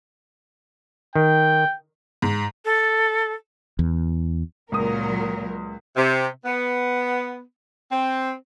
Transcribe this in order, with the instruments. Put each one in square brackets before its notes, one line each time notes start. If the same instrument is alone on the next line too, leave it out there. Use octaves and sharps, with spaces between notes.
[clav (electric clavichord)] D#3 [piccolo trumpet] G5
[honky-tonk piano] G#2
[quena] A4
[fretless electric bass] E2
[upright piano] C#2 D#6 [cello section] A#2 F#3 [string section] A#4
[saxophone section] C3
B3
C4